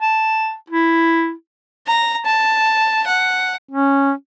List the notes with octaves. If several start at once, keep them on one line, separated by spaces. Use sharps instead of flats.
A5
E4
A#5
A5
F#5
C#4